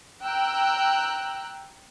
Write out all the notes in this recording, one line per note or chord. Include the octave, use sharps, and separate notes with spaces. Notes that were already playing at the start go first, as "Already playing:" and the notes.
G5 A#5 E6 F#6